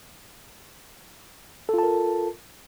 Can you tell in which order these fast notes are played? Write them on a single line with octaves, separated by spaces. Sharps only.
A4 F4 A5 A#4